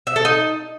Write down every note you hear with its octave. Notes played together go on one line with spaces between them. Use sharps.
E5
A4
D#4